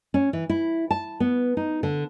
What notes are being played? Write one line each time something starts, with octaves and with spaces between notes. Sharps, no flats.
C#4
E3
E4
A5
B3
D#4
D3